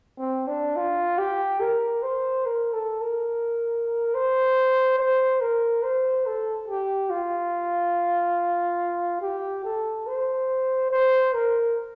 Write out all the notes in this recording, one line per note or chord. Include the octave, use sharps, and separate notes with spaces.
C4
D4
F4
G4
A#4
C5
A#4
A4
A#4
C5
C5
A#4
C5
A4
G4
F4
G4
A4
C5
C5
A#4